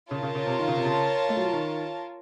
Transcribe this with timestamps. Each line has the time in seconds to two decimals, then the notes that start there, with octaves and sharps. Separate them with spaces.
0.11 C#3 F4 A#4 C#5 A5
0.23 C#3
0.35 C#3
0.47 C3
0.59 D#3
0.68 C#3
0.77 C3
0.85 C#3
1.29 A3
1.37 F#3
1.46 F3
1.53 D#3